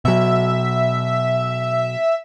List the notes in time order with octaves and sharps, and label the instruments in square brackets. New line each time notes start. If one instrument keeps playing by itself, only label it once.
[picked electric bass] B2 F#3 [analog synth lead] E5